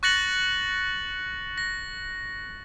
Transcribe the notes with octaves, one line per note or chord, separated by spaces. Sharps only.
C#6 F#6 A6 A#6 C#7 F#7
A#6